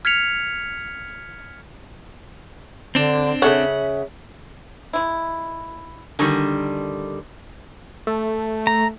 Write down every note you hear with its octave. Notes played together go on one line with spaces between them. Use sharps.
F6 G#6 B6 C#7 F7
D3 C4 D4
C#3 G#4 A4 C#5 E5 F#5
G#3 E4
D3 D#3 G3 F#4 G#4 A#4
A3
A#5